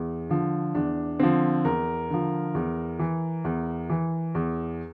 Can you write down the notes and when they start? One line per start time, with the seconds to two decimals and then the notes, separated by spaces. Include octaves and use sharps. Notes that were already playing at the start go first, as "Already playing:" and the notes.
Already playing: E2
0.30 D3 F3
0.75 E2 D4
1.19 D3 F3 C4
1.65 E2 A#4
2.10 D3 F3
2.54 E2
2.99 E3
3.44 E2
3.89 E3
4.35 E2